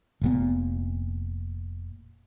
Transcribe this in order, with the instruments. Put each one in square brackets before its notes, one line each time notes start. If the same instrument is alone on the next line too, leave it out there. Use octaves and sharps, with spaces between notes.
[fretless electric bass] F1 A#2 B3